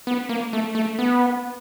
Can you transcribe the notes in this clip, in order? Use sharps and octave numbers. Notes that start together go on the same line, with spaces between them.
B3
A#3
A3
A3
B3